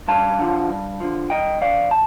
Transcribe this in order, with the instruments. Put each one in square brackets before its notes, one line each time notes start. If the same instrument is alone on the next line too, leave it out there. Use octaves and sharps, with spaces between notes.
[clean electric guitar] G2 F5 A5
D3 F3
G2
D3 F3
G2 D#5 G5
F3 D5 F5
A5